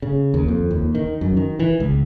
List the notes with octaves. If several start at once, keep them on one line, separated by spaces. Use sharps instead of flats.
C#3
D#2
F2
D#2
D#3
F#2
D#3
E3
C#2